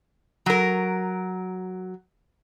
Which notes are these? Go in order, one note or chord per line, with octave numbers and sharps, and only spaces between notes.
F#3 A#4